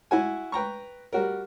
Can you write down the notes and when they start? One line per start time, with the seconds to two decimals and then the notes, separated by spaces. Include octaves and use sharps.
0.11 E4 F#4 G#5
0.52 B4 G5 A#5 C#6
1.13 G3 F#4 A#4